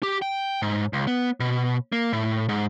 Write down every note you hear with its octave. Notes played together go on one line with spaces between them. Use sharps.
G4
G5
G#2
C#2
B3
B2
A#3
A2
G#2